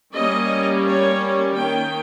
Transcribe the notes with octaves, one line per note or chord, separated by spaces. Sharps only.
G3 A#3 C#4 D#5
C#5
D#3 A#3 C#4 G5